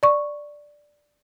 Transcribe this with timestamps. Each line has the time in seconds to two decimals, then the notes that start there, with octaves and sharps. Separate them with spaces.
0.03 D5 C#6